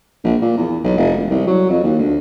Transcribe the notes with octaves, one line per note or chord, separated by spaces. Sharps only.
A#1
A#2
E2
B1
F1
E1
C2
F#3
F2
D#2
D2